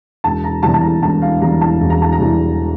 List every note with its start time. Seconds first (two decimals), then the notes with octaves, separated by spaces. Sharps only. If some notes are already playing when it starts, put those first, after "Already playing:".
0.24 E1 A5
0.44 A#5
0.63 E2 E3 G3 A5
0.74 A5
0.83 A#5
1.01 E1 A5
1.22 F5
1.42 E2 E3 G3 A#5
1.61 A5
1.80 E1
1.90 A#5
2.02 A5
2.12 A#5
2.19 E2 E3 G3